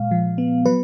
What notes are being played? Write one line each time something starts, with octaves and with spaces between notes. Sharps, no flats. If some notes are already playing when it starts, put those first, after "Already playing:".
Already playing: A#2 G#3 F5
F3
B3
F#3 B4